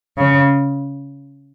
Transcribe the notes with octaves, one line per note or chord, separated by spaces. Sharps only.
C#3